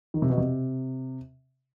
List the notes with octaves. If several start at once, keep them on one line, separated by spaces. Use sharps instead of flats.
D#3
C3
B2
C3